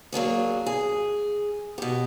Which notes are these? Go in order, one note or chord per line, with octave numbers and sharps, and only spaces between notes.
F#3 A#3 D4 G#4
G#4
B2 G4